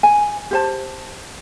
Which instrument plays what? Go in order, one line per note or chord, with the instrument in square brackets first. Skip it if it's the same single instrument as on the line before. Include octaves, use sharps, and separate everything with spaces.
[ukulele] G#5
G4 C5 A5